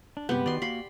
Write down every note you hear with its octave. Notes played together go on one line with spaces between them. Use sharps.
D4
G2 C3 G#3 B3 G4
D#3 D#4 F#4 D5 C6
A#3 F#4 F5 B5 C6